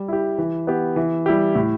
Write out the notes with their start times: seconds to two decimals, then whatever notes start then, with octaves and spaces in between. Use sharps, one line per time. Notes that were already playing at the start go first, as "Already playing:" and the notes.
Already playing: G3
0.08 E4 G4
0.38 E3
0.67 B3 G4
0.96 E3
1.26 G3 E4 G4
1.55 A2